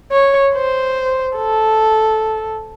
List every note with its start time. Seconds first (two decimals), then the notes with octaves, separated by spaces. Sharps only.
0.11 C#5
0.54 C5
1.37 A4